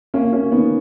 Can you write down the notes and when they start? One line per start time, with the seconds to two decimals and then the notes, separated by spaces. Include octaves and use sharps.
0.14 A#3 C#4
0.33 A#3 C#4
0.51 D#3 B3